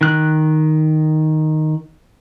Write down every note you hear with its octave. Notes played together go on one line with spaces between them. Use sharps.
D#3 F#6